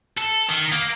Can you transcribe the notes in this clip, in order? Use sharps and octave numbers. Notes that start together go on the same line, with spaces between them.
A4
D#3
A#3